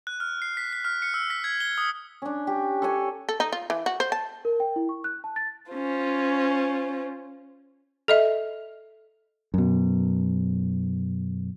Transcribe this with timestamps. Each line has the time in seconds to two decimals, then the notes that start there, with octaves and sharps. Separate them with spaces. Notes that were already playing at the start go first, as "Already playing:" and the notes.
0.07 F#6
0.20 F6
0.42 C7
0.57 B6
0.73 B6
0.85 F6
1.02 C#7
1.14 E6
1.30 B6
1.44 G#6
1.60 G7
1.78 D#6
2.22 C#4 D4
2.47 G4
2.82 A4 C#5 G#5
3.29 A4
3.40 D#4
3.52 F4
3.70 E3
3.86 F#4
4.00 C5
4.12 A5
4.45 A#4
4.60 G5
4.76 E4
4.89 C#6
5.04 F#6
5.24 A5
5.36 A6
5.72 C#4 F4 C5
8.08 A4 D#5 E5
9.54 F#2 B2